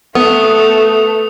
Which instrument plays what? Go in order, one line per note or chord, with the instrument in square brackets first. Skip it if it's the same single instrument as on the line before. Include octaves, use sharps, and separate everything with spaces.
[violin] A3 [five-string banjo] B3 [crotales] D#6